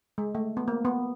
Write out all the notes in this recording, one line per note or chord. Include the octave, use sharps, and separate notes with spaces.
G#3
A3
B3
A#3
B3